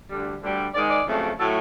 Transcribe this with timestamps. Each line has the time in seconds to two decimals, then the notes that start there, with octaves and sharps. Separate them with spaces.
0.10 D2 D3 G3
0.42 D2 D3 G3
0.74 G#2 D#3 G#3 D5
0.90 D5
1.06 F2 C#3 F#3 A3
1.39 A2 F#3 A3 A4